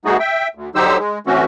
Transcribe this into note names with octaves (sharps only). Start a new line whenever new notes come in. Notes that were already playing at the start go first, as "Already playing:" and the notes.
G3 A3 B3 D#4 F#4 G#4
E5 G5
D2
D3 F#3 D#4 G4 C5 E6
G#3
E3 A3 C4 C#4 F#4